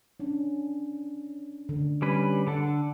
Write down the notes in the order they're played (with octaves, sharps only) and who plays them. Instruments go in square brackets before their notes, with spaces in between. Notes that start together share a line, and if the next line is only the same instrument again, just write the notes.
[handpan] C#4 D4
D3
[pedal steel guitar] G3 C#4 B4
D3 A4 F#5